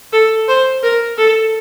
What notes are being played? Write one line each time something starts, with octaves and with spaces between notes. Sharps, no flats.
A4
C5
A#4
A4